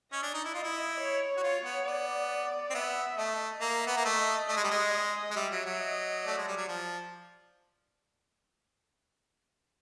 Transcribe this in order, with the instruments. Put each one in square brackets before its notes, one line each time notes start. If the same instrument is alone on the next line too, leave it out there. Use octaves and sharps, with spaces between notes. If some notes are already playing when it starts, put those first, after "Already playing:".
[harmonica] C#4 [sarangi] D#5
[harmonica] D4
D#4
E4
[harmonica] F4 [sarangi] D#5
[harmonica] E4
[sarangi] C#5
[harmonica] F#4
[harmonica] F4 [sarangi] C#5
[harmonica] B3
[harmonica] B3 [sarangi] D5
[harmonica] C4
[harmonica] B3 [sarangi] E5
[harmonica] A3 [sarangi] D#5
[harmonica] A#3 [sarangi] E5
[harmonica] B3
A#3
[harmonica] A3 [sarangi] D#5
[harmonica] A3 [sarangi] D#5
[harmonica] G#3
G3
G#3
[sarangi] D#5
[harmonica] G#3
[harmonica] G3 [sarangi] E5
[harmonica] F#3
F#3
[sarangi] D#5
[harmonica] A3 [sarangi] D5
[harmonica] G#3
G3
F#3
F3